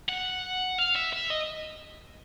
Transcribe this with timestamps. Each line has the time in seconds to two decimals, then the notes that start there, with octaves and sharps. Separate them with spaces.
0.09 F#5
0.79 F5
0.96 E5
1.13 E5
1.30 D#5